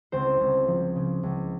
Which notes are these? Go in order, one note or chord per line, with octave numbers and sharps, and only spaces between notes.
C#2 C4 C5
C#2
F3
C#3
C#2